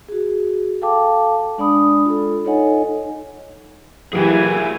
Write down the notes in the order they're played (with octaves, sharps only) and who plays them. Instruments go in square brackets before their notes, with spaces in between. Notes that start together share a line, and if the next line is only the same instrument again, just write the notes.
[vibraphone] F#4 G#4
A4 F5 G5 A5 D6
G#3 D4 D5 B5 D#6
F4 A4
D#4 A4 C#5 D#5 F#5 G#5
[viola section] E3 G#5 [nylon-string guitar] F#3 A#3 G4 [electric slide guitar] G#4 A#4 E5